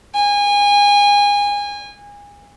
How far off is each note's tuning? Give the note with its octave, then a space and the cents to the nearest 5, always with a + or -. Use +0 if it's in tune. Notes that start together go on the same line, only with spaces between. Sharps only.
G#5 -30